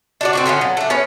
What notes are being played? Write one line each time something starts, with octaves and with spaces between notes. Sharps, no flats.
D4 F#4 D5
C4 D#4 F#4
D3 B3 C#4 F4
F#3
A3 D4
B3 C#4 C#5